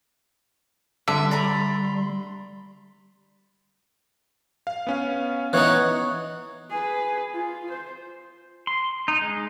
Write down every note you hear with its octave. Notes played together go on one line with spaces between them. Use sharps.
D3 G3 E5 C6
D5 A#5 B5
F5
B3 C#4 F5
E3 B3 D#4 C#5 F#6
G#4 B4
F4
C5
C6
D#4
G#3